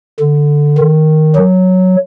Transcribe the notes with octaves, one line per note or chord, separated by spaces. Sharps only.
D3
D#3
F#3